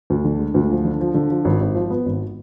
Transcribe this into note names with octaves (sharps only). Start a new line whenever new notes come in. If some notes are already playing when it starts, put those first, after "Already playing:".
D2
D3
G#3
D2
F3
D3
F3
D3
F3
G#1
G#1
F3
B3
G#1